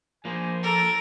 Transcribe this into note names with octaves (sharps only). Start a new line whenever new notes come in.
F3 A#3 C5 G#5
A4 A#4